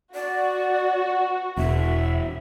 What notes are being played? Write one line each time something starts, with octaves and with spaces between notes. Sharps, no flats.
F#4 D5
E1 E5